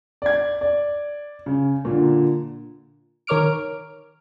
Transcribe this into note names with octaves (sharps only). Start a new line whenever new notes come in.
D5 G#6
D5
C#3
A#2 D3
D#3 A#4 C#5 D6 F6 D7